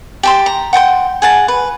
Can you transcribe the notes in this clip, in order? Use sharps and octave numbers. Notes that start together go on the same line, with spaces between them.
G4 A5 C6
A#5
F#5 G5 A5 C6
G#4 F#5 A5
B4